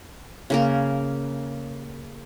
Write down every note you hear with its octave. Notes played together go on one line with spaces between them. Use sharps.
C#3 A#3 A#4